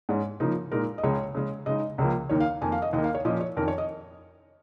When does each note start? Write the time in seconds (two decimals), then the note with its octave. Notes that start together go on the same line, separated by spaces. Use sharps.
0.09 G#2 G#3 C#4
0.40 C#3 F3 A#3 D#4
0.72 A#2 G#3 D#4 A#4
0.98 D#5
1.03 C#2 C#3 G#3 C#5
1.35 C#3 G#3 C#4
1.66 C#3 G#3 D#4 D#5
1.98 C#2 C#3 F3 A#3
2.29 D#2 D#3 A#3 C#5
2.40 F5
2.61 F2 D#3 A#3 G#5
2.72 F5
2.82 D#5
2.93 D#2 D#3 A#3 D#5
3.04 F5
3.15 C#5
3.25 A#2 F3 C#4 D#5
3.41 C#5
3.57 F2 D#3 C#4 A#4
3.68 C#5
3.78 D#5